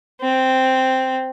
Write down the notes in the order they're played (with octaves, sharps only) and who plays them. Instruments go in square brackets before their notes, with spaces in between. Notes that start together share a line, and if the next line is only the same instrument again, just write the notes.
[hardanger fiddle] C4